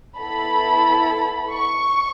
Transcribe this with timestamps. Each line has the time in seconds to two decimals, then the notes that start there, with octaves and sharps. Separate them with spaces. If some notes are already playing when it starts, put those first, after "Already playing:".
0.18 B3 E4 A4 B5
1.52 C#6